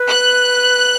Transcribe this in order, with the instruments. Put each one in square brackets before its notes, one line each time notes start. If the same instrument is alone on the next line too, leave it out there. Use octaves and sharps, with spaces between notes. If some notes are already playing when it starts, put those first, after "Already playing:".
Already playing: [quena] B4
[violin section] F#6